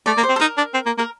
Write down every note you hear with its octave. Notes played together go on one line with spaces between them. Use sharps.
A3 D5
A#3
C5
C4
A4
D#4 A#4
D4
C4
A#3
A#3 A#4